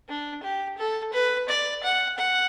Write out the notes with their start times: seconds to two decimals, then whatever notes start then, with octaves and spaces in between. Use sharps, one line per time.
0.09 D4
0.43 G4
0.78 A4
1.13 B4
1.49 D5
1.83 F#5
2.18 F#5